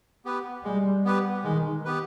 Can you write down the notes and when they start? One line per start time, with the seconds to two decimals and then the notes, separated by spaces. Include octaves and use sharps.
0.25 B3 G4 B4
0.64 G3 G#3
1.05 B3 G4 B4
1.44 D#3 G#3
1.85 B3 G4 B4